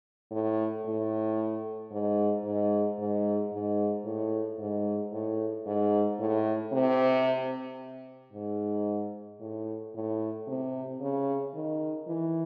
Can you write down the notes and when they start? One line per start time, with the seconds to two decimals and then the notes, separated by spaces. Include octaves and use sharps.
0.31 A2
0.85 A2
1.91 G#2
2.44 G#2
2.98 G#2
3.52 G#2
4.05 A2
4.59 G#2
5.12 A2
5.66 G#2
6.19 A2
6.72 C3
8.33 G#2
9.40 A2
9.94 A2
10.47 C3
11.01 C#3
11.54 D#3
12.07 E3